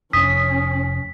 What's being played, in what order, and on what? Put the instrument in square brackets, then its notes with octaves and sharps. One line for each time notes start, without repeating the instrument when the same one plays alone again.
[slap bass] F1 [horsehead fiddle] C#4 [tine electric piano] D#6 [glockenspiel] B6